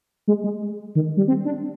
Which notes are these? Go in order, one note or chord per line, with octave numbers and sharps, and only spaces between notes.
G#3
G#3
D#3
G3
C4
D4